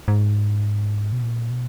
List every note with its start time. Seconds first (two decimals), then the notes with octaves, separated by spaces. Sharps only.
0.08 G#2
1.12 B2
1.22 A#2
1.50 B2